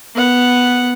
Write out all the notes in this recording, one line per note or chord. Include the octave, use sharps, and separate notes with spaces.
B3 F#5